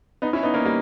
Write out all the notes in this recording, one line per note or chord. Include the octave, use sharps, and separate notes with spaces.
B3 D#4
C#4 E4
B3 D#4
A#3 C#4
G3 A#3